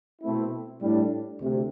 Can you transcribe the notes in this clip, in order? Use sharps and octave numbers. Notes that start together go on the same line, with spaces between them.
B2 A3 C4 E4
A2 G3 D4
D2 C3